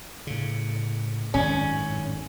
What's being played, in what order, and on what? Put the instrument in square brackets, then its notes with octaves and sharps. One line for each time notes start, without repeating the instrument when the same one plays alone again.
[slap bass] A2 C#3
[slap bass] G#1 F#2 A2 [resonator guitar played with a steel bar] C#4